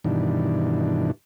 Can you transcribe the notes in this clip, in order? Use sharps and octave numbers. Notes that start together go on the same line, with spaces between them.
G2 B2 D#3 E3 D4